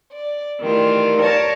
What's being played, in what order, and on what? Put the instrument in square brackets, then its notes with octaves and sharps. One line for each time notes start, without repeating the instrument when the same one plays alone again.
[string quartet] D5
D#3 E3 G3 A3 F4
A#4 C#5 D5 F5 A5